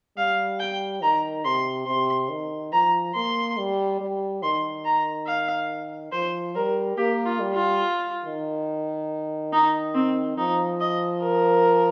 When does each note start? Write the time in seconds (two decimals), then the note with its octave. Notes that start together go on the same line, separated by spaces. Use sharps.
0.17 G3 F5
0.60 G5
1.02 D#3 A#5
1.45 C3 C6
1.87 C3 C6
2.30 D#3
2.72 F3 A#5
3.15 A#3 C6
3.57 G3
4.00 G3
4.43 D#3 C6
4.85 A#5
5.27 F5
6.12 F3 C5
6.55 G3 A#4
6.97 A#3 G4
7.25 F4
7.40 G3
7.54 F4
8.25 D#3
9.53 D#4
9.95 C4
10.38 F3 D#4
10.81 D#5
11.22 A#4